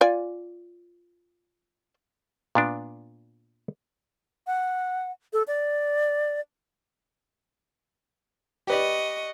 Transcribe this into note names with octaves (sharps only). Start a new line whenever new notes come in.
F4 D5 G#5
A#2 B3 D4
F#5
A4
D5
G4 B4 D5 D#5 C#6